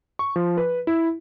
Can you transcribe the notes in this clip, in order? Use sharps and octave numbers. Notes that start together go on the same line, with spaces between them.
C#6
F3
B4
E4